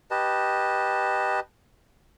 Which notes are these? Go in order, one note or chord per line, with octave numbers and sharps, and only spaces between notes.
G4 B4 D#5 A5